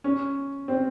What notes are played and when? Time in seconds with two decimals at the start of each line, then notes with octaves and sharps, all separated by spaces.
0.04 C#4
0.68 C4